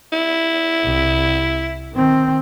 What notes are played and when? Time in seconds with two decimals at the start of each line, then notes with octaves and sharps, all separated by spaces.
0.13 E4
0.84 C2
1.93 D#3 C4